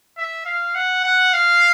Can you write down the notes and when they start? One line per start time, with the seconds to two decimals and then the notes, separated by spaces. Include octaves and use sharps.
0.18 E5
0.46 F5
0.75 F#5
1.04 F#5
1.33 F5